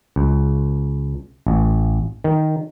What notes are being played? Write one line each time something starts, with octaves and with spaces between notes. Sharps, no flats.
C#2
A1
D#3